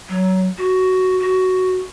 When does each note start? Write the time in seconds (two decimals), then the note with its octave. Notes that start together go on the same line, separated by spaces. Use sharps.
0.09 F#3
0.58 F#4
1.19 F#4